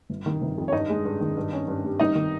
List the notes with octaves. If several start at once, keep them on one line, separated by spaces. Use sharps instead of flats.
G1
D#3
G1
F2
C#5
G2 D#4 D#5
G#3
G2
D#3
G2
C#4
G2
G3
G1 D#4 D#5
D#3